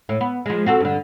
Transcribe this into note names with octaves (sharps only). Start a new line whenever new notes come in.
A2
B3
F3 G#3
C4 F#4 A4
G2 D3